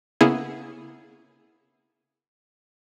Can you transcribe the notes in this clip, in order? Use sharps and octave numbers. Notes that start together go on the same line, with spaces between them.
C#3 A#3 B3 E4 G#4